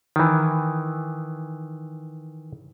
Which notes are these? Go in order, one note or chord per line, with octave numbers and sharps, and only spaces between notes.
D#3 E3